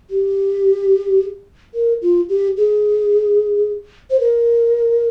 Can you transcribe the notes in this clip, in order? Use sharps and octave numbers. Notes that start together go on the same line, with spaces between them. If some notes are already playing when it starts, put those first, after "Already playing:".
G4
A#4
F4
G4
G#4
C5
A#4